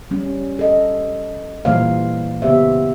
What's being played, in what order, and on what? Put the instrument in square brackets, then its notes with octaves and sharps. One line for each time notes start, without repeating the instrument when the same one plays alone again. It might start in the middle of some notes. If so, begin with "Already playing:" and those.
[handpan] G3 C#4
A4 D#5
A#2 E3 G3 A#3 C5 F5
C#3 B3 G4 C5 E5